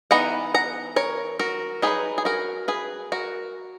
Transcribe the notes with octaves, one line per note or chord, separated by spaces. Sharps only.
E3 B3 D#4 F#5 A#5
F#5 A#5
A#4 C#5
F#4 A#4
F#3 A#3 D#4 G#4 B4
G#4
F#4 A#4
G#4 B4
F#4 A#4